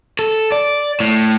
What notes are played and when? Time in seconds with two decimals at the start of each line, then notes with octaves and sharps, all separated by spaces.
0.19 A4
0.52 D5
1.00 A2